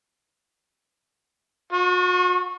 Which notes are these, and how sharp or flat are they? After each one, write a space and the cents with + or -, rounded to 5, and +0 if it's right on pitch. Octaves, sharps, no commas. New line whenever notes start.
F#4 -40 C#6 -10